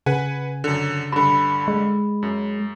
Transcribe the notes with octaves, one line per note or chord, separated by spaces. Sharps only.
C#3 B4 F#5 G#5
F#2 D3
G2 D3 B5
G#3
F#2